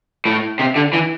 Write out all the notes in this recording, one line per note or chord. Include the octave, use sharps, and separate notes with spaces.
A2
C3
D3
E3